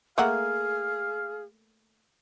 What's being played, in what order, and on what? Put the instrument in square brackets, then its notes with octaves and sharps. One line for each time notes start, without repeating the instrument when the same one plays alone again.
[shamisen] A3 A#3 F#5 [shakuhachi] G#4 [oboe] F5